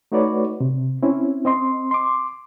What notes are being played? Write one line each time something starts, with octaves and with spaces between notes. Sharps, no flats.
A3 D#4 F#4 B4 C#5 D5
C3
C4 C#4 E4
C4 D#5 C6
C6 D6